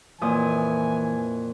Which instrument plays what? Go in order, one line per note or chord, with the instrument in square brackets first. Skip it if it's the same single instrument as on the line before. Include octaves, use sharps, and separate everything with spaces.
[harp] F2 A#2 D#6 [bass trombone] E3 [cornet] G#5